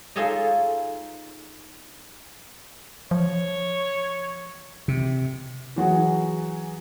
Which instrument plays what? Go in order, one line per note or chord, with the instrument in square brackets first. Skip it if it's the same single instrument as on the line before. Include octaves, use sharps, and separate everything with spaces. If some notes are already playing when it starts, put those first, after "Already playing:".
[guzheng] D#4 F4 G#4 A4 C#5 D#5
[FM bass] F3 [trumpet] C#5
[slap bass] C3
[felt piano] E3 F#3 F#4 G#4